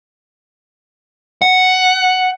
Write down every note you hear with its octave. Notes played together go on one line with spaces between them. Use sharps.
F#5